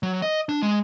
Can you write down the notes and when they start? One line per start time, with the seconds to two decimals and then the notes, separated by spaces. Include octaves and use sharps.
0.03 F#3
0.22 D#5
0.49 D4
0.62 G#3